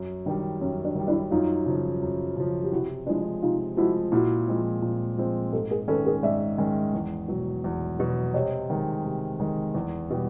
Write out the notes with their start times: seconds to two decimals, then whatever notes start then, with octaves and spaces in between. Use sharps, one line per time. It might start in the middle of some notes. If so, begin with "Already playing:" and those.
Already playing: F#2
0.26 D#3 G3 D4
0.61 F#2 C#4
0.84 D4
0.95 D#3 G3
1.07 D4 E4
1.31 F#2 D#4 F4
1.66 C#3 F3
2.02 F#2
2.36 C#3 F3
2.64 G4
2.72 C3 E4 F#4
3.06 F3 G#3 D4 E4
3.42 C3 D#4 F4
3.77 F3 G#3 E4 F#4
4.12 A#2 E4 F#4
4.48 F3 G#3 C4
4.82 A#2
5.18 F3 G#3 C4
5.52 G#2 G4 A4
5.71 G#4 A#4
5.88 D#3 G#3 C#4 A4 B4
6.06 G#4 A#4
6.23 G#2 D5 E5
6.58 D#3 G#3 C#4
6.94 E2
7.28 B2 F#3
7.64 E2
7.99 B2 F#3
8.34 C3 C#5 D#5
8.70 D#3 G#3
9.04 C3
9.40 D#3 G#3
9.74 E2
10.11 B2 G3